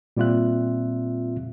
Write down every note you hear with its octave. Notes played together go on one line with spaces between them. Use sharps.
A#2 G3 C4 F4 E5 F#6